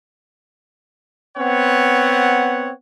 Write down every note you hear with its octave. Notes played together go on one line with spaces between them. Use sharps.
B3 C4 C#5 F#5